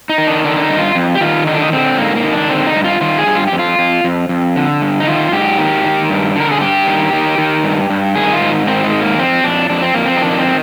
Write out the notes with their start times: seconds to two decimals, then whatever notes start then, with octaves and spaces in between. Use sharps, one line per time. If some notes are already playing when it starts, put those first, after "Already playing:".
0.09 D#4
0.18 D#3
0.27 D4
0.44 D3 D4
0.56 D4
0.62 D#4
0.70 G2
0.78 F4
0.95 F2
1.15 G4
1.21 D#3 F4
1.47 D3 D#4
1.54 D4
1.62 D#4
1.72 D3 C4
1.98 G#2 A#3
2.15 A#3
2.23 D#3
2.33 D4
2.49 D3 C4
2.66 D#4
2.76 G2
2.84 F4
3.01 D#3 F4
3.18 G#4
3.27 G2
3.35 F4
3.47 F2 G4
3.59 F4
3.79 F2
4.04 F2
4.29 F2
4.56 D3
4.81 G2
5.00 D#4
5.07 D#3 F4
5.32 G#2 G4
5.58 D#3
5.85 D#3
6.10 G2
6.36 D3 A#4
6.51 G#4
6.61 G2 G4
6.87 D#3
7.13 D#3
7.38 D#3
7.64 G2
7.90 G2
8.15 D#3 G#4
8.33 F4
8.41 G#2
8.67 D#3 C4
8.84 G#3
8.93 G#2
9.01 A#3
9.18 F2 C4
9.44 F2 D4
9.70 F2 D4
9.82 C4
9.94 F2 A#3
10.06 C4
10.17 D#4
10.21 D#3 D4
10.33 A#3
10.39 C4
10.47 D#3